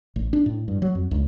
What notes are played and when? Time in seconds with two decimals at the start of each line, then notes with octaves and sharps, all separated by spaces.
0.16 A1
0.33 D4
0.46 A2
0.68 G2
0.82 F#3
0.95 F2
1.11 C#2